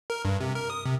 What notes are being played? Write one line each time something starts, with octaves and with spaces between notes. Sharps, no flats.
A#4
G2
C3
A#4
D#6
C3